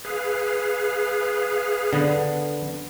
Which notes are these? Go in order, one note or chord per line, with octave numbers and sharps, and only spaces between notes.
G#4 B4 F5
D3 B3